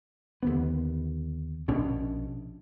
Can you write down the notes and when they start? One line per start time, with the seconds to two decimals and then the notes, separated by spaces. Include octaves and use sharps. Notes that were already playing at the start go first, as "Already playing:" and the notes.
0.43 D#2 D3 B3
1.68 A#1 B2 C#4 D4